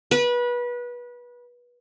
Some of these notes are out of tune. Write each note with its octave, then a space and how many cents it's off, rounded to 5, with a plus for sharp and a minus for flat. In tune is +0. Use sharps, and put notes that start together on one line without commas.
B4 -25